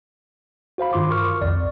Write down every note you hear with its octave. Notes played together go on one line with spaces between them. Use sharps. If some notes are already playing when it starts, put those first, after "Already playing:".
F#4 C5 F5 B5
G2 D#3 F4 C6 D6
A#4 C#6 F6
C2 F2 D5